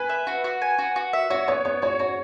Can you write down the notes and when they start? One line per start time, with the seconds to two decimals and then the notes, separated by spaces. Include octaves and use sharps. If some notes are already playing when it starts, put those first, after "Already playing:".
Already playing: B4 G#5
0.09 E5
0.27 F#4
0.44 F#4
0.62 G#5
0.79 F#4
0.96 F#4
1.13 E5
1.30 F#4 C#5
1.48 B3 C#5
1.65 B3 C#5
1.82 F#4 C#5
1.99 F#4 C#5